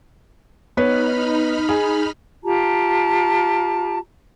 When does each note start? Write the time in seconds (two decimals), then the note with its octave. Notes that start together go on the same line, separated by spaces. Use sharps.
0.77 B3 D#4 B4 C#5 B5 F6
1.69 G#4
2.43 F4 G4 A5 A#5